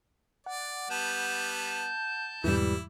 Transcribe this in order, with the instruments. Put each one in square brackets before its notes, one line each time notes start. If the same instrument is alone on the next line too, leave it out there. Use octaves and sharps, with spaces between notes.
[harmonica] D5 [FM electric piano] F#5
[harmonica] G3 B3 [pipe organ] A5 G6
[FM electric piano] E2 G#2 B2 [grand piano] E3 G3 [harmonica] E4